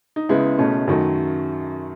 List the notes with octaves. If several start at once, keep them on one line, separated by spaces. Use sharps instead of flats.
D#4
C#2 C#3 G#3 B3 E4
C#2 B2 A3 C#4
F#2 D#3 F#3 A3